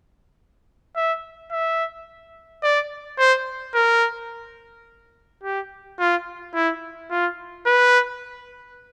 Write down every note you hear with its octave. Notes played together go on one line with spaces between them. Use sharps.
E5
E5
D5
C5
A#4
G4
F4
E4
F4
B4